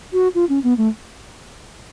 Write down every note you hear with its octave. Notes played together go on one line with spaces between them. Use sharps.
F#4
F4
C#4
B3
A3